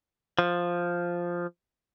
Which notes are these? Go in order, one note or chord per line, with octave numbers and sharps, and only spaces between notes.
F3